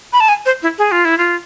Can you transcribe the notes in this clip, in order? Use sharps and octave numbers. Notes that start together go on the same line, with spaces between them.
B5
A5
G#5
C5
E4
G#4
F4
E4
F4